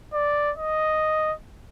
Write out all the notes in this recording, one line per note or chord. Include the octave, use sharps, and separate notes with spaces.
D5
D#5